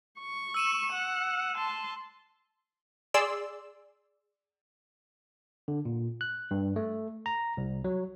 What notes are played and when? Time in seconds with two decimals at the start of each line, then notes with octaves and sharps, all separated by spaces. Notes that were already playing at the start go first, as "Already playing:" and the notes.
0.20 C#6
0.54 E6 D#7 E7
0.92 F#5
1.56 A5 C6
3.14 G#4 D5 C6 E6
5.68 D3
5.85 A#2
6.21 F#6
6.51 G2
6.76 A3
7.26 A#5
7.57 C2
7.84 F#3